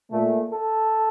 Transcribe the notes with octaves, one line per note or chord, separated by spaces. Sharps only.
A#2 A3
A4